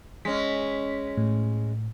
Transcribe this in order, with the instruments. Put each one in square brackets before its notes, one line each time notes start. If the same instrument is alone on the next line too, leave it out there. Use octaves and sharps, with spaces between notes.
[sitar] G#3 C#4 [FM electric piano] B6
[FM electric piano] A2